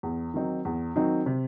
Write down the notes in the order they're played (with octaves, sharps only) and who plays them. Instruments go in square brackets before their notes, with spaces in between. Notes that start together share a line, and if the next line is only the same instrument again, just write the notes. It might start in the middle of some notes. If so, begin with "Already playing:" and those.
[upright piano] E2
D#3 F#3 C4 D#4
E2
D#3 F#3 C4 D#4
C3